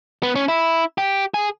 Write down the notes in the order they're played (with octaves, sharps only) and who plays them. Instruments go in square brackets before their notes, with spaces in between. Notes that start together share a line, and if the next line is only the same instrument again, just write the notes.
[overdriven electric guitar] B3
C#4
E4
G4
G#4